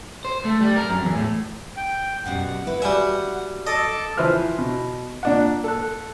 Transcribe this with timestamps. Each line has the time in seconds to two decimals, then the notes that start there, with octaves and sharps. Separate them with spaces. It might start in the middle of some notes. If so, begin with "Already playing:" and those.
0.25 C5
0.45 A3
0.61 G3
0.76 A#4
0.90 F#2
1.03 E2
1.15 A2
1.77 G5
2.26 F#2 B2 G3 F#5
2.67 E4 B4
2.82 G3 F#4 E5 G5 G#5
3.67 A4 D#5 A5 D6
4.17 E3 F3 E4 B4 C5 F6
4.58 B2
5.23 A#2 D4 F#5
5.64 A4 F#6